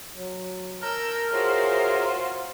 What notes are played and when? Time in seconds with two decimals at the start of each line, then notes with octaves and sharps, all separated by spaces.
0.15 F#3
0.82 A#4 A5 E6 G6
1.32 F4 F#4 G#4 C5 C#5 E5